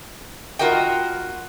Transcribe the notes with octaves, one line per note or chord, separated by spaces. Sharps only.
F4 F#4 A#4 D#5 G5